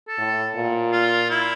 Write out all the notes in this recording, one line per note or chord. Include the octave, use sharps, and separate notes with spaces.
A4
A2
A#2
F4
E4